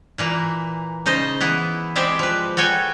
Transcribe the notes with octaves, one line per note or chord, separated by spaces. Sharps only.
A#2 E3 A#3
C#3 D#4 C5 D#5 A5
E3 B3 E4
G#3 C4 G4 C5 D5 E5
F3 B4
F#4 A4 C#5 G5 G#5